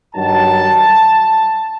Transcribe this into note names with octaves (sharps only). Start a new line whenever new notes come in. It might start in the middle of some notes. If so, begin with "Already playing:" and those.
G2 D#3 F#3 A5